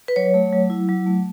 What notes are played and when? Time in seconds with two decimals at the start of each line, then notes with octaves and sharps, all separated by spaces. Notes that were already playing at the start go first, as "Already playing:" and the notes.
0.08 B4
0.16 F#3 C#5
0.34 A3
0.53 F#3
0.70 E4
0.89 F#3
1.06 A3